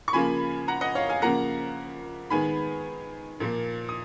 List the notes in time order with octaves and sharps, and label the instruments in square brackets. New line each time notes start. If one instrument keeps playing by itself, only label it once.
[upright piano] C#6
C#3 F3 A#3 G#5 B5
F#5 A#5
D#5 F#5
C#5 F5
F5 G#5
C#3 F3 A#3 F#5 A#5
D#3 G#3 B3 G#5 B5
A#2 F3 A#3
D#6